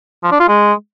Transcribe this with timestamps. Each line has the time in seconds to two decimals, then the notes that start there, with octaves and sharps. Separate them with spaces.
0.23 F3
0.31 D4
0.40 F4
0.48 G#3